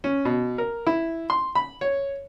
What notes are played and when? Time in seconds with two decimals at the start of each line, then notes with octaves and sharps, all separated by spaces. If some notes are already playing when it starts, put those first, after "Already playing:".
0.04 C#4
0.25 B2
0.58 A#4
0.87 E4
1.30 C6
1.55 B5
1.81 C#5